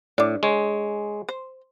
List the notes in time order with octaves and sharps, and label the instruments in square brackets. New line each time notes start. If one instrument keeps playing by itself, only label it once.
[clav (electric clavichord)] A2 [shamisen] D4 D5
[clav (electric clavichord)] G#3 C#5
[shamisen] C5